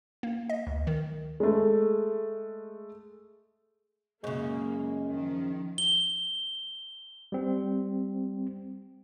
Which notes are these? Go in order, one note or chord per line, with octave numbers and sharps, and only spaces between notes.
A#3
D#5
D2
D#3
G#3 A3
F#2 C#3 G#3 A#3
D#3 F3
G7
G3 C4